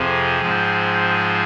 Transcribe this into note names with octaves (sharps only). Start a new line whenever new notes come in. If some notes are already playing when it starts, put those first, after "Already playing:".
Already playing: F2 C3 F3 G#4
G#2 F3 C4
G#4